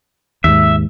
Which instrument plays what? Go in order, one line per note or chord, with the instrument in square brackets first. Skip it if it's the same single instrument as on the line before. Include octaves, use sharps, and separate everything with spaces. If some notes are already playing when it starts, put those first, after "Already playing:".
[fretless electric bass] D#2 G#2 [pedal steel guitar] E5